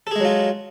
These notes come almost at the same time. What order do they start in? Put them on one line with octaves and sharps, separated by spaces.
A4 G#4 G#3 F#3 F4